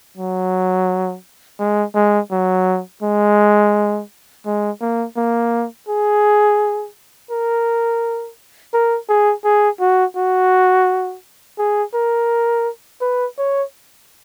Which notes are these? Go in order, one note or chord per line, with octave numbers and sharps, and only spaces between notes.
F#3
G#3
G#3
F#3
G#3
G#3
A#3
A#3
G#4
A#4
A#4
G#4
G#4
F#4
F#4
G#4
A#4
B4
C#5